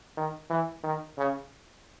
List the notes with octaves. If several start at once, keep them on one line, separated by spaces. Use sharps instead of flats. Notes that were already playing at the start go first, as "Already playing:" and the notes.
D#3
E3
D#3
C#3